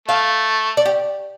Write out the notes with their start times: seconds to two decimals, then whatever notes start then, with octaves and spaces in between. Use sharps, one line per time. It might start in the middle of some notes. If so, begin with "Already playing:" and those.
0.08 A3 F5
0.77 D5
0.85 G4